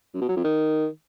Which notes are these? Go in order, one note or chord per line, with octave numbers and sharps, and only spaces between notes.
F#2
B2
F#3
F2
D#3